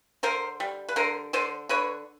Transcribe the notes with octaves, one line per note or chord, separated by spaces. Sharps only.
D3 A#4 C5
G3
B4
D3 A#4 C5
D3 C5 D5
D3 B4 C#5